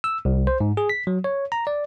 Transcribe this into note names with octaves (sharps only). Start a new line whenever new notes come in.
E6
C2
C5
G#2
G#4
B6
F#3
C#5
A#5
D5